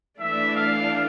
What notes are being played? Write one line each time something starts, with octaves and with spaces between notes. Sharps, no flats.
E3 A3 D4 E5
F5